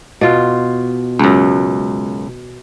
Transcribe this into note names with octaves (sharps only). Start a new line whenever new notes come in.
B2 F4
C#2 F#2